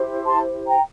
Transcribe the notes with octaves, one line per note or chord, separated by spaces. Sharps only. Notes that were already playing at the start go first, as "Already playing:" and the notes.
Already playing: E4 G4 C5
A5 C6
G5 A#5